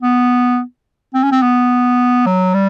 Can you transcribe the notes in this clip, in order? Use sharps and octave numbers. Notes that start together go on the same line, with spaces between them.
B3
C4
C#4
C4
B3
F#3
G3